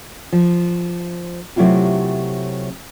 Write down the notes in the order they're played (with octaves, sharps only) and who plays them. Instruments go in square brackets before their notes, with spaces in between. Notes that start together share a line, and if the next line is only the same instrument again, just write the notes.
[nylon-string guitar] F3
C3 F#3 A3 E4 F4 G4